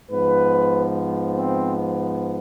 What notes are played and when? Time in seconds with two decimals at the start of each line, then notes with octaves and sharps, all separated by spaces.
0.10 G#2 F3 B3 B4
1.36 C4